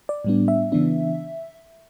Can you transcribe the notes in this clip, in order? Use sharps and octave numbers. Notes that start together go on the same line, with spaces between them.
D5
A2 G3 B3 D4
E5
C#3 E3 B3 D4